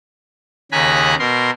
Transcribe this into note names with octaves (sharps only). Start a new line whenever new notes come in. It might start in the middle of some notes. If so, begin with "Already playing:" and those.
D#2 C#3 G#5 A#5 B5 F#6
B2 A#4 C6